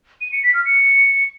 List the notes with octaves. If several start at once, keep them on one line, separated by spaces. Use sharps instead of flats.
D#7
C#7
B6
F6
C#7